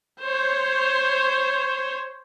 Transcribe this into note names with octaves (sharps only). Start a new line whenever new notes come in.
C5 C#5